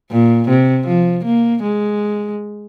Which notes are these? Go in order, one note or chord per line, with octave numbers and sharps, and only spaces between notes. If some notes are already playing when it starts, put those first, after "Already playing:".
A#2
C3
F3
A#3
G#3